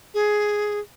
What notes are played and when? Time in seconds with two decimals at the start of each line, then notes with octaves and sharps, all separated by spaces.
0.14 G#4